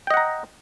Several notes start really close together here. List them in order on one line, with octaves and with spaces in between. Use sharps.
G5 D#5 F#5 A#5